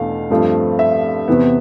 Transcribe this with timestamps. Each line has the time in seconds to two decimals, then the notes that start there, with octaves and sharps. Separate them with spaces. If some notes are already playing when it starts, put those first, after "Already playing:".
Already playing: E2 B2 A3 D4 F5
0.30 G2 F3 A3 C4
0.79 E5
1.28 E2 C3 E3 B3